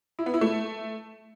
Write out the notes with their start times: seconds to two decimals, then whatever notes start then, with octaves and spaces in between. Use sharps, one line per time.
0.19 E4
0.26 B3
0.34 E4
0.41 A3